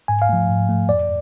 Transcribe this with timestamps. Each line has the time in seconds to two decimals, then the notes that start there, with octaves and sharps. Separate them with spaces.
0.08 G#2 G#5
0.22 F5
0.29 F3 A3
0.49 G#2
0.69 F3 A3
0.89 F2 D5